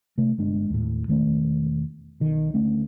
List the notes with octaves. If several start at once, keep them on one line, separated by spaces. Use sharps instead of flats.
C3 A3
G1 G#3 D4
D#2 A2
E1 D#3 A3 C#4
B1 D#3
D2 A3 C#4